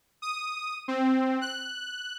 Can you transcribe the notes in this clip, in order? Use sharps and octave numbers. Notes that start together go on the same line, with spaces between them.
D#6
C4
F#6